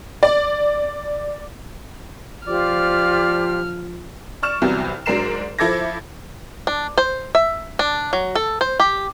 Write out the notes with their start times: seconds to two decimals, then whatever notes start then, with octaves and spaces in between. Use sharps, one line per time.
0.23 D5
2.47 F3 F4 G4 C5 D5 F6
4.43 D5 C#6 F6 E7
4.62 C2 C3 E3 F#3 B3
5.06 G#2 F#3 D4 A#4 C7 E7
5.59 F3 E4 A4 D6 G#6 A#6
6.67 D4
6.98 C5
7.35 E5
7.79 D4
8.13 F#3
8.35 A4
8.61 C5
8.80 G4